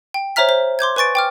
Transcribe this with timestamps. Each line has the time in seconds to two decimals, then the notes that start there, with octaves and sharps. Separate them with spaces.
0.14 G5
0.36 C5 C#5 E5 A#5 F6 B6
0.49 C5
0.79 C6 D6 G6 G#6
0.96 B4 G#5 C#6 A6 D7
1.15 G5 D6 F6